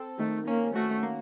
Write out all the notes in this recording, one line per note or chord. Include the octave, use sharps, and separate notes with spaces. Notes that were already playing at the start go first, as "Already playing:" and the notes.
Already playing: C4 A4
D#3 A3
A#3 C#4
A3 F#4
A#3